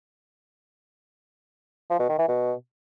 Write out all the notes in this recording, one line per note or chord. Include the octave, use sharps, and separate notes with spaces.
F3
B2
D#3
E3
B2